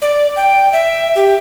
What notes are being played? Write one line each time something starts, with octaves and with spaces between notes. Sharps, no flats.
D5
G5
E5
G4